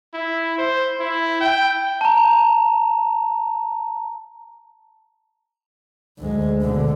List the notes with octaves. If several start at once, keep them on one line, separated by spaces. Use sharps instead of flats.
E4
C5
E4
G5
A5 A#5
D2 G#3
B2 D3